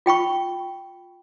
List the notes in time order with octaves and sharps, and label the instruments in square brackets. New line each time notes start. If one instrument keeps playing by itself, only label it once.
[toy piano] F4 G5 B5 C#6